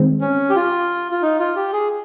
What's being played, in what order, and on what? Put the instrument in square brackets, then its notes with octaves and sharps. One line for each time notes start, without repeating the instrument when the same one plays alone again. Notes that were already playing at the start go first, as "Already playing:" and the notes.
Already playing: [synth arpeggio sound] D#3 G#3 C4
[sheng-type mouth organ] C#4
G4
F4
F4
D#4
F4
G4
G#4